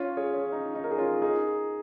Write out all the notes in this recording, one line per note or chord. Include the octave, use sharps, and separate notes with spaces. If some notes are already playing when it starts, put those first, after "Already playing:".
Already playing: C#4 F4
G#4 C#5
C#4
D#4
D#4
A#4
G#4
C#4 F4
D#4 G#4